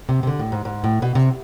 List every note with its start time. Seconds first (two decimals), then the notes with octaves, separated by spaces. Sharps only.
0.09 C3
0.23 C3
0.27 D3
0.40 A2
0.52 G#2
0.65 G#2
0.84 A2
1.02 B2
1.15 C3